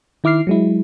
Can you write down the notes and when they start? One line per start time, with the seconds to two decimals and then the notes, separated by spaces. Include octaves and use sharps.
0.24 D#3 E4 D6 F6 C7
0.47 F#3 G#3 E4